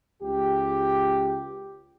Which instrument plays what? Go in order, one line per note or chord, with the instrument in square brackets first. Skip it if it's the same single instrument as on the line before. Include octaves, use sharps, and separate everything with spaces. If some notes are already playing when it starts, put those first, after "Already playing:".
[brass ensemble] C#2 G4